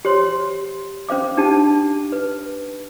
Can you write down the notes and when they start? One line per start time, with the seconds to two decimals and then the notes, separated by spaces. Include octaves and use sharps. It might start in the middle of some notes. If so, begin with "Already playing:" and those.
0.05 G4 C5 C#5 C6
1.09 C#4 C5 F5 D6
1.37 D4 D#4 G4 A5
2.12 B4